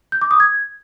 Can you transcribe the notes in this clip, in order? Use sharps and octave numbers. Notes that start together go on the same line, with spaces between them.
G6
D6
D#6
G#6